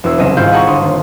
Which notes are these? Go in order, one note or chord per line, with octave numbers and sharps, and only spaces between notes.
E1 E2 E6
F#1 C2 D#5 E7
G#1 G#2 E4 F4 F5 G6
G#4 F#5 A5 A#5 C#6
G1 C6 D#6
D#1